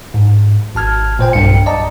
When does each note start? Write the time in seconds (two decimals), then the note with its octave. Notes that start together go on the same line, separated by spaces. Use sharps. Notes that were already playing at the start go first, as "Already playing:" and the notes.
0.14 G#2
0.75 G#1 A5 F6 G#6
1.19 A#2 C5 G5 G#5
1.33 B1 G2 G5 C#7
1.66 D5 D#5 A5 A#5